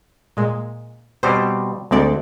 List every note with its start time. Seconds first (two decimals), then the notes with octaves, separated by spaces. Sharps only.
0.37 A#2 G#3
1.23 B2 G3 C4 C5
1.91 D2 G#3 C4 D5